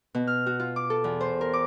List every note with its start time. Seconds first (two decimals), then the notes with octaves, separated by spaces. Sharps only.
0.14 B2
0.27 F6
0.46 F#4
0.60 F4
0.76 D6
0.90 A4
1.04 E2
1.20 C5
1.41 A#4
1.53 D6